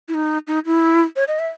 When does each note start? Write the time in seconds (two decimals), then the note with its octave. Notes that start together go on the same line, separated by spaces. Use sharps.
0.08 E4
0.14 D#4
0.47 D#4
0.66 E4
1.16 C#5
1.28 D#5
1.39 E5